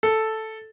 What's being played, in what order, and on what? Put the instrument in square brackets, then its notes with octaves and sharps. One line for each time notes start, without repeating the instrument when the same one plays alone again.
[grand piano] A4